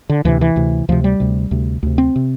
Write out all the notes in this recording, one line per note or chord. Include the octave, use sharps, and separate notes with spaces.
D3
D2 C3 E3
E3
D2 C3
D2 C3 F3
G3
D2 C3
D2 C3
D2 C3
C4
C3